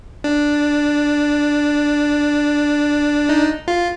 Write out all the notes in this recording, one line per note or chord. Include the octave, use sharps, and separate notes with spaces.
D4
D#4
F4